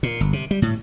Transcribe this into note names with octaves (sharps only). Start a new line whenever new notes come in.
A#2
G1
C3
G3
A2